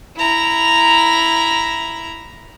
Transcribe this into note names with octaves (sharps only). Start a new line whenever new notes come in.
E4 A#5